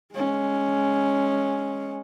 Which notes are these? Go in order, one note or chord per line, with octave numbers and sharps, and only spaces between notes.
G#3 C#4